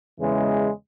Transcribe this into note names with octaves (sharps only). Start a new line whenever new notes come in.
E2 C#3 E3 G#3